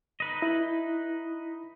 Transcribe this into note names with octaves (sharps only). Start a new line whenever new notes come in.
D#4 B4 D#5
E4